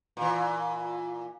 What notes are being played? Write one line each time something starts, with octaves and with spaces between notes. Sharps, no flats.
A#2 E3